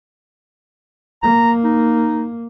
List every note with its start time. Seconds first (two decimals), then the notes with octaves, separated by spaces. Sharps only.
1.23 A#3 A#5
1.64 D#4